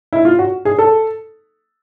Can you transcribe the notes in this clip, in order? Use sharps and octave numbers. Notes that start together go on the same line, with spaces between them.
E4
F4
F#4
G#4
A4